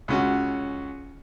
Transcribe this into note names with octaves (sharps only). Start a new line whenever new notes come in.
C#2 C#4 F#4